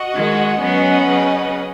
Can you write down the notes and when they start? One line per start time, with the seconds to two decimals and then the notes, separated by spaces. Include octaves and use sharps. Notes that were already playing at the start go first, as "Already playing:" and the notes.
Already playing: F#4 D#5 F#5
0.15 D#3 G#3
0.62 F#3 B3 C#4 B4 D#5 F#5
1.10 C#3 F#3